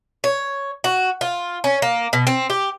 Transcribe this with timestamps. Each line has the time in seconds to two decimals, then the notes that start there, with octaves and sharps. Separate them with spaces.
0.24 C#5
0.84 F#4
1.21 F4
1.64 C#4
1.82 A#3
2.13 B2
2.27 C4
2.50 G4